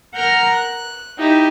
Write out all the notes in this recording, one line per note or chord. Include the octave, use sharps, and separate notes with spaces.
A#4 F#5 A#5 F6 G6
F#6
D#4 E4 G4